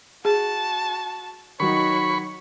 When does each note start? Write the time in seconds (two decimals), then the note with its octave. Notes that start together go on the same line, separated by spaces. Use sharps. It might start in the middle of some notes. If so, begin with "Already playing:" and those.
0.25 F#4 G#4 A5
1.60 D#3 F#3 D#4 F#4 C#5 B5 C#6